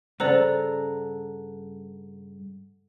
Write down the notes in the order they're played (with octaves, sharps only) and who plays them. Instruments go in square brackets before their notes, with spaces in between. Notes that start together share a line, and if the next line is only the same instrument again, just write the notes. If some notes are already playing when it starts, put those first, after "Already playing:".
[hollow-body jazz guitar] G2 C#3 [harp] A4 F#5 A#5 [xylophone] C5 D5